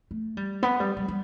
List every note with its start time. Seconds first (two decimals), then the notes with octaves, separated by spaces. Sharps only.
0.11 A3
0.37 G3
0.63 B3
0.80 G3
0.97 G3
1.08 G3